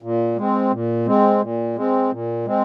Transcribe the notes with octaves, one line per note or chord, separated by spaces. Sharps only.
A#2
G#3 C4
A#2
G#3 C4
A#2
G#3 C4
A#2
G#3 C4